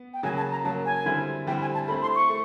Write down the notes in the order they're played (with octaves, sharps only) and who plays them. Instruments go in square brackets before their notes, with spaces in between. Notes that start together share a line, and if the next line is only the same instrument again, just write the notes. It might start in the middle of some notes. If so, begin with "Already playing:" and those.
Already playing: [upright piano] B3
[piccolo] G5
[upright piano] C#3 F#3 A#3 [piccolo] G#5
[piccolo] A5
A#5
[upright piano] C#3 F#3 A#3 [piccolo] A5
[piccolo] G#5
[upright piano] D3 G3 C4 E4
[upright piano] D3 G3 C4 E4 [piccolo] G5
[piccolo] G#5
A5
[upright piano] A3 C4 E4 [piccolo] B5
[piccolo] C6
C#6
[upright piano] A3